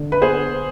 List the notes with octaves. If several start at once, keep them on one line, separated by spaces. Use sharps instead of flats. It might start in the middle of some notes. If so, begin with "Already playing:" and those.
Already playing: D3
B4
B3 G#4 C5